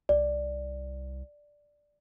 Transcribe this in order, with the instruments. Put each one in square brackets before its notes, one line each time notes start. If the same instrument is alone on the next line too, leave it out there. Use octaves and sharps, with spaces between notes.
[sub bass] C2 [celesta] D5